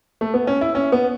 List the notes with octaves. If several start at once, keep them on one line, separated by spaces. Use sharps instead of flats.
A3
B3
C#4
E4
C#4
B3